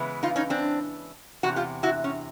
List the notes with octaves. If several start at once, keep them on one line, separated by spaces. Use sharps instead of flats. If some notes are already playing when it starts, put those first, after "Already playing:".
Already playing: C#3 E3 G#3 B3
D#4 F4
C#4 D#4
C4 D4
E2 C3 F#4
F4 G4
E4 F#4
C#4